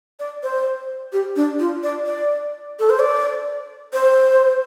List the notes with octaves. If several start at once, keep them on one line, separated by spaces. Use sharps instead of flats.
D5
C5
G4
D4
F4
D5
D5
A4
C5
D5
C5